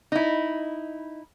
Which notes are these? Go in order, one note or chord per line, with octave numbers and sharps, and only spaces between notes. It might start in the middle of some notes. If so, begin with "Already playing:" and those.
D#4 E4